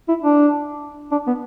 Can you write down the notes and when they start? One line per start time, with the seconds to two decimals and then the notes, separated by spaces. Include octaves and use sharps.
0.08 E4
0.23 D4
1.12 D4
1.27 B3